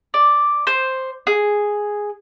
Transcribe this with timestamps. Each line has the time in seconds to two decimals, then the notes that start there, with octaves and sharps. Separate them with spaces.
0.14 D5
0.67 C5
1.27 G#4